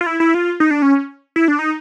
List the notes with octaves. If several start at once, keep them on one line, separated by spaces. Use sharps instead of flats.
F4
E4
E4
F4
D#4
D4
C#4
E4
D4
D#4